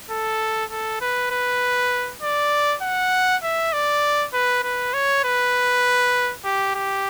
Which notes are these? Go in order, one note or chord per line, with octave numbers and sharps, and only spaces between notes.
A4
A4
B4
B4
D5
F#5
E5
D5
B4
B4
C#5
B4
G4
G4